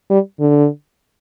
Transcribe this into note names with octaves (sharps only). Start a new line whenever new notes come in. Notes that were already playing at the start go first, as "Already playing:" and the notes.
G3
D3